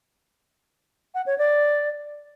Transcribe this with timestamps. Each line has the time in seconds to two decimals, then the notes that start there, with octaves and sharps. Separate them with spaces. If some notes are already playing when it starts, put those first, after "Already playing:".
1.14 F#5
1.26 C#5
1.38 D5